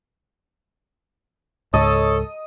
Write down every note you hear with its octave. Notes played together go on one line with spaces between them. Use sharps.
C#2 G#2 A4 C#5 D#5